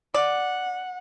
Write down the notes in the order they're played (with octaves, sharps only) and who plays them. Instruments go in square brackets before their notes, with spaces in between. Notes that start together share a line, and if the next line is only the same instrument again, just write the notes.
[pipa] D5 [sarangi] F#5